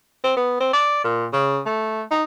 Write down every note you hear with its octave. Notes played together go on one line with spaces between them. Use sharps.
C4
B3
C4
D5
A#2
C#3
A3
D#4